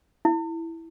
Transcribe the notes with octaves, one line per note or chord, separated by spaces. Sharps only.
E4